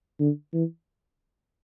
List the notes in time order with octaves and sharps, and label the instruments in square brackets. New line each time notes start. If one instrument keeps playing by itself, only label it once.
[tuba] D3
E3